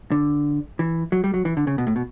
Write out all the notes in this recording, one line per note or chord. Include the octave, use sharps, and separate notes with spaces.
D3
E3
F#3
G3
F#3
E3
D3
C#3
B2
A2
B2